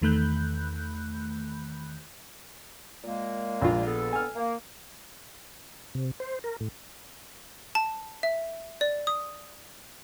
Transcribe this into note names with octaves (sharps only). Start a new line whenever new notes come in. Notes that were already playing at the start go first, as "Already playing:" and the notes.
E2 D#3 A3 B5 F#6 G6
A#2 G#3 A#3
A#1 F4
B3 A4
G#5 F6
A#3
C3
C5
A#4
A2
A5
E5
D5
D#6